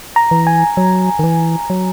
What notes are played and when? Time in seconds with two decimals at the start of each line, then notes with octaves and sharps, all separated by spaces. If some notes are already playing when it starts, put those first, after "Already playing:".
0.16 A#5
0.31 E3
0.47 G#5
0.77 F#3
1.19 D#3
1.24 E3
1.70 F#3